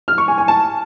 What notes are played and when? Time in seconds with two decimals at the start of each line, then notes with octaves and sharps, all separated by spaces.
0.08 F6
0.18 C#6
0.28 G#5
0.38 G#5
0.48 A5